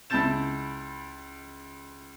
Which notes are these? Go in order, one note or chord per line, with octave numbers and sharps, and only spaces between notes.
C#2 E4 A5 G6 A6 E7